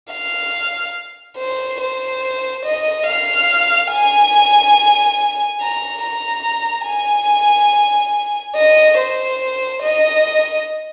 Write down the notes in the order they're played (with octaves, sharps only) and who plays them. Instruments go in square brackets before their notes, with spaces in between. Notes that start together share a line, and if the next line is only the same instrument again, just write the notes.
[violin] F5
C5
C5
D#5
F5
G#5
A#5
A#5
G#5
D#5
C5
D#5